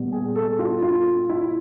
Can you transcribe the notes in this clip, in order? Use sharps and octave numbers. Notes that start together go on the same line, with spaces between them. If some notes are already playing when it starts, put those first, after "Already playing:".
Already playing: A#2 G3 B3
G#4
A4
F4
F4
E4